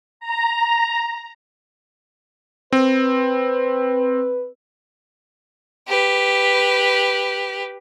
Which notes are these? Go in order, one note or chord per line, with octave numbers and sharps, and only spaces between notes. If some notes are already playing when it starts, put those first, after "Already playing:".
A#5
C4 B4
G4 B4